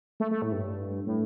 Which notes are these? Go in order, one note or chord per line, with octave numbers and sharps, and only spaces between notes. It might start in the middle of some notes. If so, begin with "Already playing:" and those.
A3
A3
A2
G2
A2